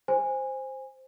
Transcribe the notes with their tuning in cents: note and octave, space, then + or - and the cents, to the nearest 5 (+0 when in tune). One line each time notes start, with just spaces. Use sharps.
C5 +5 G#5 -20